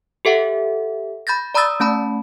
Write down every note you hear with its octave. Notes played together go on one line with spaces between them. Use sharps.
G4 A4 E5 F#5
B5 G6 A6 A#6
D5 A#5 B5 D#6 E6 A6
A3 C#4 A5 B5